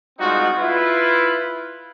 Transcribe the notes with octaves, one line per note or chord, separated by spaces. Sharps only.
G3 G#3 C4 D#4 F4 F#4
E4 F4 B4